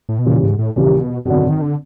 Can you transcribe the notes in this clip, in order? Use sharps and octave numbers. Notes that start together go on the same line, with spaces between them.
A2
B2
D#2 A#2 C#3 E3 G3
G#2
A2
D#2 A#2 C#3 E3 G3
A#2
B2
G#1 F#2 B2 D3
D#3
D3